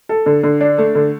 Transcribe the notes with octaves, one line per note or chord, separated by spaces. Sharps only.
A4
D3
D3
D4
A3
D3